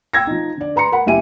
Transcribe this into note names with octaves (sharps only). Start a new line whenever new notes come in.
G5 E6 G#6 A#6
F3 D#4
D3 D5
B4 A#5 C6 C#7
A#4 F#5 B5
F#1 E4 G4 E5 G#5 D#7